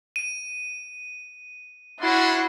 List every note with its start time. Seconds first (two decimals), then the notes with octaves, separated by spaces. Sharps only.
0.16 D#7
2.00 C#4 D4 E4 F#4 C6